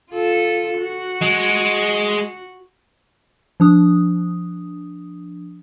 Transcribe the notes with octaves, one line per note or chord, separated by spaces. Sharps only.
F4 A4
F#4
G#3
F3 D4 D#6